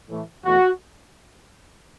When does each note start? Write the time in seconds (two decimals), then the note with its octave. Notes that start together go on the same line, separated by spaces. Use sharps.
0.09 A2 E3 A3
0.45 E2 B2 A3 F#4